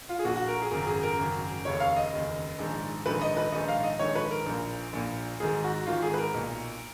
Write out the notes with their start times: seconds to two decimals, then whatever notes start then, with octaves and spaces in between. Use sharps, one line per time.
0.09 F4
0.19 G#4
0.24 A#1 A#2 F#4
0.36 F#4
0.48 A#4
0.62 G#4
0.71 G#1 F#2 C#3 A#4
0.87 G#4
1.03 A#4
1.18 G#1 F#2 C#3
1.65 F1 D#2 C#3 C#5
1.80 F5
1.96 D#5
2.12 F1 D#2 C#3
2.59 A#1 G#2 D#3
3.06 A#1 G#2 D#3 B4
3.22 D#5
3.37 B4
3.52 A#1 G#2 D#3 D#5
3.68 F5
3.83 D#5
3.99 A#1 G#2 D#3 C#5
4.15 B4
4.31 A#4
4.46 A#1 A#2
4.93 A#1 A#2
5.40 G#1 G#2 D#3 G#4
5.64 F#4
5.86 G#1 G#2 D#3 F4
6.02 G#4
6.14 B4
6.18 A#4
6.34 B1 A#2